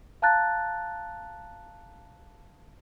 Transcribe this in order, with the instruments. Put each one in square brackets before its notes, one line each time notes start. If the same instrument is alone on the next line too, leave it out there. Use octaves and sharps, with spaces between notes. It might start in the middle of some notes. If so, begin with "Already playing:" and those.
[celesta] F5 A5 A#5 F#6 A6